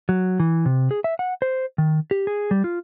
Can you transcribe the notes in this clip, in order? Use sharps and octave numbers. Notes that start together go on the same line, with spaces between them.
F#3
E3
C3
G#4
E5
F#5
C5
D#3
G4
G#4
G3
F4